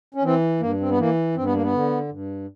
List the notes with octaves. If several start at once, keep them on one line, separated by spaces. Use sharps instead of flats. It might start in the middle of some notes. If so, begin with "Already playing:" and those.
C#4
E3 C4
G2 A#3
C4
B3
E3 A#3
G2 C4
B3
A#3
B3
D3
G2